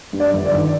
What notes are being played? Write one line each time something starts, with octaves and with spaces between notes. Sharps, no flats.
G2
D5
G1
D5
D#3